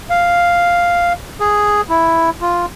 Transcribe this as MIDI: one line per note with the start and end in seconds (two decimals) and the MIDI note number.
0.10 1.13 77
1.40 1.81 68
1.89 2.30 64
2.41 2.66 65